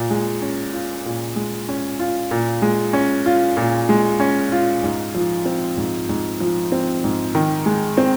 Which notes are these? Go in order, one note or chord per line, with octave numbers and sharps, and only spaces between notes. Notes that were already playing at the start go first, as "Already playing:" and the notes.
Already playing: A#2
G#3
C#4
F4
A#2
G#3
C#4
F4
A#2
G#3
C#4
F4
A#2
G#3
C#4
F4
G#2
F3
C4
G#2
G#2
F3
C4
G#2
D#3
G#3
C4